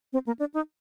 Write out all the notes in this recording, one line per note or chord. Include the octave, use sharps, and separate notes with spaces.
C4
A#3
D4
D#4